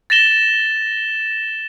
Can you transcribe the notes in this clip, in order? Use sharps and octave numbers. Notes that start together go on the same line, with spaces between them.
A6 A#6 E7 G7